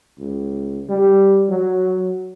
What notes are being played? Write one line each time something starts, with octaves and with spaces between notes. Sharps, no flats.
C#2
G3
F#3